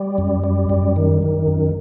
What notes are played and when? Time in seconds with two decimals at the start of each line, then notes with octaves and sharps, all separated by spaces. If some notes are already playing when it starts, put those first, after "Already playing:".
Already playing: G3
0.18 F#2
0.44 G3
0.69 F#2
0.96 D#3
1.22 D#3
1.47 F#2